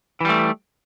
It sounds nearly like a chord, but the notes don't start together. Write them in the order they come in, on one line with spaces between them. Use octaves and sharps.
E3 G3 A3